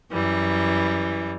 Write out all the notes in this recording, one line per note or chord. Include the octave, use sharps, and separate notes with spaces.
F#2 E3 G3